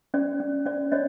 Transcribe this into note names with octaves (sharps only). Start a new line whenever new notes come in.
C#4 D5
C#4
C#4 D5
C#4 C#5 D#5